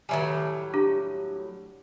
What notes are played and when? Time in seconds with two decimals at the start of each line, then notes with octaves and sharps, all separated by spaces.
0.09 A2 D#3 F#3 G3 E5 G#5
0.74 D4 G4